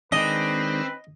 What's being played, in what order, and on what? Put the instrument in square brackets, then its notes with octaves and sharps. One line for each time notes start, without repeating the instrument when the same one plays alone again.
[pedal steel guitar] D#3 G#3 D4 [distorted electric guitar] C4 [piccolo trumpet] B4 [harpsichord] D#5